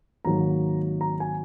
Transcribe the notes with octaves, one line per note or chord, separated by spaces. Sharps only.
G#1 G#2 F#3 A#3 A#5
A#5
G#5